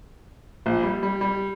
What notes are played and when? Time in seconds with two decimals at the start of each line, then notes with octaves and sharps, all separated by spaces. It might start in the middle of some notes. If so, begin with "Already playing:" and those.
0.66 A#1
0.83 G3
1.03 G3
1.21 G3